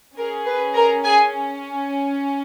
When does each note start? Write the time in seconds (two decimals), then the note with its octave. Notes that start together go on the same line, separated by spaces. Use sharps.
0.16 C#4 G#4 A#4
0.45 B4
0.74 A#4 A#5
1.03 G#4 G#5